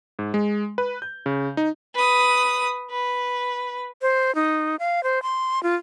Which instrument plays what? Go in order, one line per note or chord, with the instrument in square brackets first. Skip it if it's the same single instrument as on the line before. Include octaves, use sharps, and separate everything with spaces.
[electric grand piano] G#2
G#3
B4
G6
C#3
D#4
[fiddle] B4 D#6
B4
[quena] C5
D#4
F5
C5
C6
F4